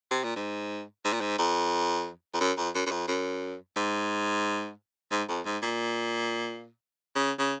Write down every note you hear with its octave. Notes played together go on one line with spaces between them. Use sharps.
C3
A#2
G#2
G#2
A#2
G#2
F2
F2
F#2
F2
F#2
F#2
F2
F#2
G#2
G#2
F2
G#2
A#2
C#3
C#3